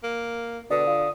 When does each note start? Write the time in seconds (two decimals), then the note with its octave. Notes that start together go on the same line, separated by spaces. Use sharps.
0.03 A#3
0.71 B2 D3 D5 D#6
0.87 F4